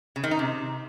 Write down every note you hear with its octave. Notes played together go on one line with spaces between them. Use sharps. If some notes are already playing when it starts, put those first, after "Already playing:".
C#3
D#3
D#4
C3